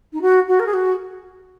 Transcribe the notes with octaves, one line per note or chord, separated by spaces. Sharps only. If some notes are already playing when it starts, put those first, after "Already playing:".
D#4
F#4
F#4
A#4
G#4
F#4